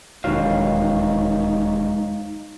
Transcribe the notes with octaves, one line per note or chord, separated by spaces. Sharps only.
E1 D#2 G#2 D#3 F#3 D#4 F5